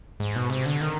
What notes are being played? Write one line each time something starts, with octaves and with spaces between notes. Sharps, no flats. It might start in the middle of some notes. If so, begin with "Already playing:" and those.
G#2
B2
C3
D3
D#3